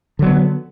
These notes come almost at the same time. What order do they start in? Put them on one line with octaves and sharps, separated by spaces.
D3 F#3 B3